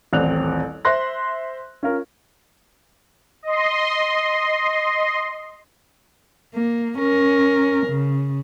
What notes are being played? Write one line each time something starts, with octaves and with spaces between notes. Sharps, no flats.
D#1 A1 C4 D5 F#6 F7
C5 E5 C6 F#6 A#6
C#4 F4 A#4
D#5 C6
A#3
C#4 A#4
C#3